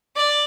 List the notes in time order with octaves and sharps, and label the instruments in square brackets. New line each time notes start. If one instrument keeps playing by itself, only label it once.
[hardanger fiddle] D5